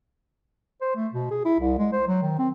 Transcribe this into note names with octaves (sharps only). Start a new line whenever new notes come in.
C5
A3
B2
G#4
E4
C2
G#3
C5
F#3
D#3
C4